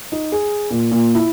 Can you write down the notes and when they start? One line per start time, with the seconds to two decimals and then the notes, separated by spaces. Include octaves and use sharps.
0.12 D#4
0.32 G#4
0.71 A#2
0.92 A#2
1.15 E4